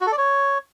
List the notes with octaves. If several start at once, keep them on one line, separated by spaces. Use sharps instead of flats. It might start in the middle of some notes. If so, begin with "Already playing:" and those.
F#4
A4
D5
C#5